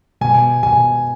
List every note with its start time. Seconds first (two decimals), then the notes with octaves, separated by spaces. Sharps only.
0.21 B2 G#5
0.63 B2 G#5